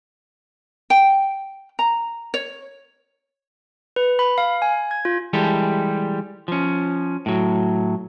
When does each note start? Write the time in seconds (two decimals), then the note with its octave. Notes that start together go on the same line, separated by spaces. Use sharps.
0.90 G5
1.79 A#5
2.34 C#5
3.96 B4
4.19 B5
4.38 F5
4.62 G#5
4.91 G#6
5.05 F4
5.33 E3 G3 G#3 G4 A4
6.48 F3 C#4
7.26 A2 F#3